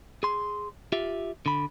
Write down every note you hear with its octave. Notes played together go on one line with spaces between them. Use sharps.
G#4 C6
F4 G4 E5
D3 B5